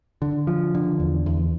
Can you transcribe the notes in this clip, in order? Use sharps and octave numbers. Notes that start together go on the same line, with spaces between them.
D3
F3
D3
E2
E2